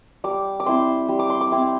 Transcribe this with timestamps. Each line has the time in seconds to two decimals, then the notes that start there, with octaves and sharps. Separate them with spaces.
0.24 G3 D6
0.60 D6
0.66 C4 E4 C6
1.08 G3
1.19 D6
1.30 C6
1.41 D6
1.52 C4 E4